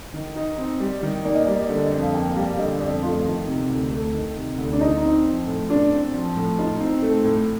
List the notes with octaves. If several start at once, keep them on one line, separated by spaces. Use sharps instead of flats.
D#3
D#4
C4
G3
D#3
A#3 D5
D#5
D5
G3
D#5
D3
D#5
F2
F5
A#3 G5
G5
G3 F5
F5
D3 D#5
F2 D5
A3 F4
D#3
C3
D2
A3
D#3
C3
D2
D4
D#4 F4
C4
F3
A2
D4 F4
C4
F3
A2
D#4 F4
C4
A3
A2